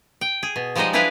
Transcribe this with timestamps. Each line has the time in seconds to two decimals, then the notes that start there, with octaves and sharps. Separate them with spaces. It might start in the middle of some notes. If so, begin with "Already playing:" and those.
0.21 G5
0.43 G#4
0.56 B2
0.76 F3 G3 G#3 D#4 C5 D#5
0.93 D4 E4 G4 G#4 B4 F5